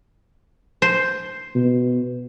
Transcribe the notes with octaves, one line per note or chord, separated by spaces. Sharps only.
C5
B2